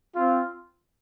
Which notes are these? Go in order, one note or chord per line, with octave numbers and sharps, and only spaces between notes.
C4 F4